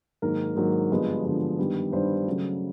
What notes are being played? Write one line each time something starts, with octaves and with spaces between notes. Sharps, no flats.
G#2 D#3 F#3 A#3 A#4
G#2 D#3 F#3 A#3
G2 D3 F3 G#3 B3
G2 D3 F3 G#3 B3
G2 D#3 G3 B3
G2 D#3 G3 B3 C5
C#3 F#3 A3